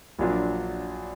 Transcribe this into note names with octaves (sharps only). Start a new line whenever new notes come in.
A#1 A#2 F#3 D4 F4